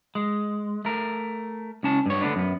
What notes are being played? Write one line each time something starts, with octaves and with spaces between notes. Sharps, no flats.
G#3
A3 A#4
C#2 C#4 A5
G2 C#5
D3 A3 B3 D4
F#2 B3